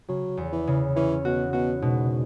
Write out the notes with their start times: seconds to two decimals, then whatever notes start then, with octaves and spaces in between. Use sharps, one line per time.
0.08 C#3 F#3
0.37 E2
0.53 E3
0.67 C#3
0.96 E3 C#4
1.25 B2 F#4
1.53 B2 F#4
1.82 G#2 B2